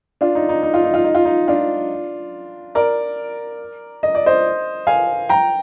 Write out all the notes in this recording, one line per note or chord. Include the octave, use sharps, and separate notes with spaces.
D4 F4
D#4
D#4
D#4
F4
D#4
F4
D#4
F4
D#4
D4 F4
A#4 D5
D#5
D5
C5 D#5
F5 G#5
G5 A#5